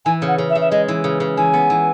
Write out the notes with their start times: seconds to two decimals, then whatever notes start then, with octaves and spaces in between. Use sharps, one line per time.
0.05 E3 G#5
0.22 C#3
0.28 F#5
0.38 C#3
0.50 E5
0.55 C#3
0.61 E5
0.71 G#3 D#5
0.88 E3
1.04 C#3
1.20 C#3
1.37 E3 G#5
1.54 B3
1.70 E3